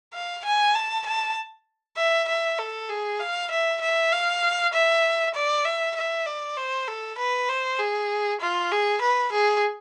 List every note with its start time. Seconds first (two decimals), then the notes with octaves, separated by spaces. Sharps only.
0.14 F5
0.45 G#5
0.75 A5
1.06 A5
1.97 E5
2.28 E5
2.59 A4
2.89 G#4
3.20 F5
3.51 E5
3.81 E5
4.12 F5
4.73 E5
5.34 D5
5.65 E5
5.96 E5
6.26 D5
6.57 C5
6.88 A4
7.18 B4
7.49 C5
7.79 G#4
8.41 F4
8.71 G#4
9.02 B4
9.32 G#4